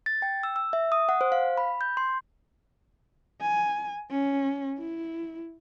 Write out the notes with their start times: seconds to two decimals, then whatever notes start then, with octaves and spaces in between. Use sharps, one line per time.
0.06 A6
0.22 G5
0.43 E6
0.56 E6
0.73 E5
0.92 D#6
1.09 F#5
1.21 C5
1.32 F5
1.57 B5
1.81 G6
1.97 C6
3.41 G#5
4.10 C#4
4.79 E4